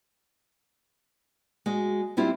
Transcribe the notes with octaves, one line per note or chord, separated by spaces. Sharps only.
G#3 F#4
G3 C4 E4 F4 G4